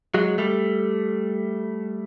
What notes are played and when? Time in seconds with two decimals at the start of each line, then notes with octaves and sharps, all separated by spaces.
0.14 F#3 G#3
0.38 G3 A3